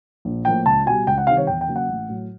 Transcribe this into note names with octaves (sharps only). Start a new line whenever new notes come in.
A#1
A2 F3 A#3 G5
C#2 A5
B2 G3 G#5
C#2 G5
F#5
C3 D#3 G3 F5
C#5
E2 G5
G5
C#3 F#3 A#3
F#5
A1
A2 F#3